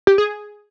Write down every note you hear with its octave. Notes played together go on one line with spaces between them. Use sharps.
G4
G#4